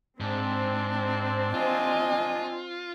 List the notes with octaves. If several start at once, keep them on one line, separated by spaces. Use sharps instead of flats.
G#2 C4 D4
F4 D#5 G#5